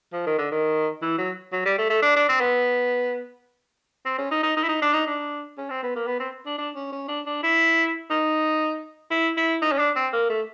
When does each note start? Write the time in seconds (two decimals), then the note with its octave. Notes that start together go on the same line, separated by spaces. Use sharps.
0.13 F3
0.26 D#3
0.38 D3
0.52 D#3
1.02 E3
1.18 F#3
1.53 F#3
1.66 G3
1.78 A3
1.90 A3
2.02 D4
2.16 D4
2.29 C4
2.41 B3
4.05 C4
4.18 C#4
4.31 D#4
4.43 D#4
4.57 D#4
4.63 E4
4.68 D#4
4.82 D4
4.94 D#4
5.07 D4
5.58 C#4
5.70 C4
5.83 B3
5.96 A#3
6.07 B3
6.20 C4
6.46 D4
6.58 D4
6.76 C#4
6.92 C#4
7.08 D4
7.26 D4
7.43 E4
8.10 D#4
9.11 E4
9.37 E4
9.62 D#4
9.72 C#4
9.79 D4
9.96 C4
10.13 A#3
10.30 A3